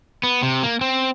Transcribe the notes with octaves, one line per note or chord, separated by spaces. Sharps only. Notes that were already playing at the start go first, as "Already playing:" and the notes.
B3
C3
A#3
C4